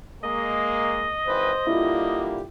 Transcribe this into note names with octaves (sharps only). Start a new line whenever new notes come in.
G#3 A#3 D#5
G#1 E3 B4 C5
D3 G3 A#3 E4 F4 G4